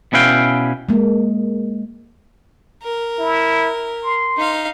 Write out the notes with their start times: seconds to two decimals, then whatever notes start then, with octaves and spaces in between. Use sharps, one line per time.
0.13 B2 C#4 E4 B4 F5 G5
0.89 G#3 A#3
2.83 A#4
3.19 E4
4.03 C6
4.37 D#4 F5